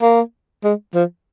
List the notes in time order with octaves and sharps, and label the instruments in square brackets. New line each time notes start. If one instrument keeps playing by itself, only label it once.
[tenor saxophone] A#3
G#3
F3